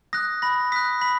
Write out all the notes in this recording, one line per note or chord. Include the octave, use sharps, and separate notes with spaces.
D#6 F#6 A#6
B5 A#6
D#6 F#6 B6
B5 B6